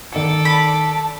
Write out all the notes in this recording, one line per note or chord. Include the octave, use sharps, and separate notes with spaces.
D#3 A4 D5 C#7
A5 B5